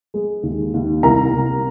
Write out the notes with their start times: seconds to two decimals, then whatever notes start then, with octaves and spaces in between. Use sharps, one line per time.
0.14 G#3
0.43 D#2
0.74 D#2
1.03 C2 A#4 A#5
1.33 C2